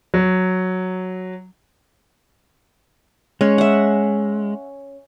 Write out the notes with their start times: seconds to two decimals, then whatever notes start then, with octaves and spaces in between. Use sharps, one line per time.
0.14 F#3
3.41 G#3 C#4
3.58 E5 F#5